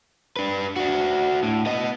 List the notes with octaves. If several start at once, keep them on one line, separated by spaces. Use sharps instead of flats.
D4 B4
D4 F#4
A2
B3 D#5